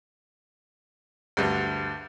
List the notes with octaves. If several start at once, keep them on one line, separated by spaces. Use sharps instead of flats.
D2 G2